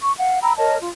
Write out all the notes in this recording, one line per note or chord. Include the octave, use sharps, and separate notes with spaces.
C#6
F5 F#5
G5 A#5 B5 E6
A#4 C#5 D#5 A5
F4